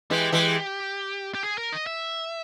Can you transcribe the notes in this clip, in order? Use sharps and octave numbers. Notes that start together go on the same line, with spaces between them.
E3 G#3 G4
E3 G#3
G4
G#4
A#4
D#5
E5